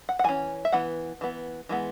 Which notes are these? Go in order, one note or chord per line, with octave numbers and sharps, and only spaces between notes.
F#5
F#5
E3 C#4 G#5
E5
E3 B3 F#5
E3 B3
E3 G#3 B3